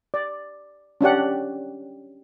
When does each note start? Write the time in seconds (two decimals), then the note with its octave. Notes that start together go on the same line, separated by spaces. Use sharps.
0.14 D5
1.01 C#4 D4 G4 F#5